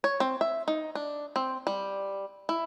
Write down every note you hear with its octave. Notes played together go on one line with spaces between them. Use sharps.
C#5
C4
E5
D#4
D4
C4
G3
E4